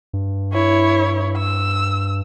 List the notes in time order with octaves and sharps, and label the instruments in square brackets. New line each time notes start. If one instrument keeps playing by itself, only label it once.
[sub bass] G2
[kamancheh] E4 C#5
E6